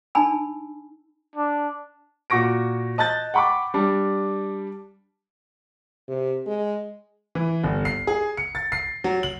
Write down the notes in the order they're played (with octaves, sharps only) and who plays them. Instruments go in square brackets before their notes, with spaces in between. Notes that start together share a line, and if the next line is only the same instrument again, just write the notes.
[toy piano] D4 D#4 G#5 A5 B5 E6
[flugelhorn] D4
[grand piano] A#2 F#4 C#6 A#6 D7
D#5 A5 F#6 G6 A6
F#5 G5 B5 C#6 D6
G3 D4
[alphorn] C3
G#3
[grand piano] E3
G1
C7
G#4
C#7
A6
C7
F#3
F#7